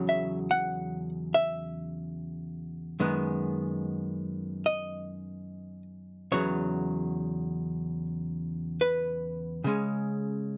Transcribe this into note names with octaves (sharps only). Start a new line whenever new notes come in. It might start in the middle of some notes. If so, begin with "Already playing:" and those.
Already playing: E2 C#3 F#3
E5
F#5
E5
F#2 D#3 G#3 B3
D#5
E2 C#3 F#3 B3 C#5
B4
C#3 G#3 C#4